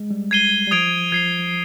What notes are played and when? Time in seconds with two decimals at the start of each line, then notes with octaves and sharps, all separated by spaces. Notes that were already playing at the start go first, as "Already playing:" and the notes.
Already playing: G#3
0.11 G3
0.31 G#6 C7 D#7 G7
0.67 G3
0.71 F3 D#6 G#6 D7 F7
1.12 F3 G#6 C7 G7